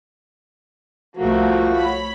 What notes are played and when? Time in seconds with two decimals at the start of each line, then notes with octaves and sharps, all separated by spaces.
1.17 C2 F3 A3 A#3 F#4
1.76 C#5 B5